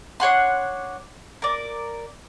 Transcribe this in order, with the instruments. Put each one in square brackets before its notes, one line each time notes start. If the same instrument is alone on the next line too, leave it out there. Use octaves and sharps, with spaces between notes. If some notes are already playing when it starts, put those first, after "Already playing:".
[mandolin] D4 C#5 F#5 C6
A#4 D5